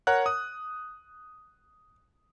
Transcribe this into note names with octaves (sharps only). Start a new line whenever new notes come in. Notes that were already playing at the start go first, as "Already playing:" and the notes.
A#4 C#5 F#5 A#5 F#6
D#6